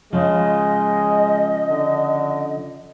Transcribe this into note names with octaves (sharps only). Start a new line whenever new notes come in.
C#3 F3 G#3 D#5
D3